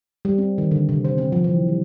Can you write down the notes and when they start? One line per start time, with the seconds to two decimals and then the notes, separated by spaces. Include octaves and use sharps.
0.25 G3
0.38 C4
0.58 D#3
0.71 D3
0.89 C3
1.05 C5
1.18 C4
1.32 F3
1.44 E3
1.56 D#3
1.68 G3